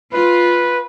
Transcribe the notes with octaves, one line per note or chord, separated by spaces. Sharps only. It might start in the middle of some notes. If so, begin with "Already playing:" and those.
F4 B4